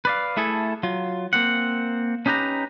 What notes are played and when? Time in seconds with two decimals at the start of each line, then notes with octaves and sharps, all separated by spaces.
0.05 B4 D5 F5
0.37 A3 E4 G#4 A4
0.83 F#3 F4
1.33 A#3 C4 F#5
2.26 C#4 D#4 G4 B4 A#5